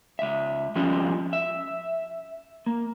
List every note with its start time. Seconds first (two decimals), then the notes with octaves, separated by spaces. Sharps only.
0.19 C#2 E5
0.76 F3 G3 G#3 C4 C#4 F4
1.33 E5
2.66 A#3